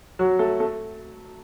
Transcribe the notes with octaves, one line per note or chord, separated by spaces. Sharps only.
F#3 F#4
A3 A4
A3 A4